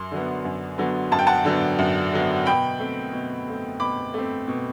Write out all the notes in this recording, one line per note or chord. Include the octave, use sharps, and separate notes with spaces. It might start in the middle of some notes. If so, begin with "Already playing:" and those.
Already playing: F#2 C6
D3 F#3 B3
F#2
D3 F#3 B3
F#2 A5
G5
F#5 A5
D3 F#3 B3
F#2
D3 F#3 B3
B2 G5 B5
A3 C4
B2
A3 C4
B2 B5 D6
A3 C4
B2